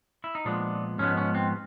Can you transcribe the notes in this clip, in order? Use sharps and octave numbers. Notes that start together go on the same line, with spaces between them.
E4
D#4
A#2 F3 G#3 B3 D4
G#2 F3 G#3 B3 C#4
C#4
C4